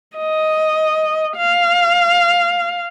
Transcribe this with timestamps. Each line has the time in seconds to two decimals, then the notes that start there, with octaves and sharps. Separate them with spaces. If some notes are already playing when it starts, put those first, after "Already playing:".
0.17 D#5
1.37 F5